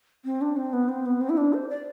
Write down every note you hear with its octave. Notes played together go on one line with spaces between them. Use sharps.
C4
D4
C4
B3
C4
B3
C4
E4
D4
C5
D5